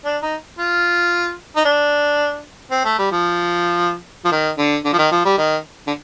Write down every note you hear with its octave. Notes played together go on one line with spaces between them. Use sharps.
D4
D#4
F4
D#4
D4
C4
A3
G3
F3
F3
D#3
D3
D3
F3
D#3
F3
G3
D#3
D3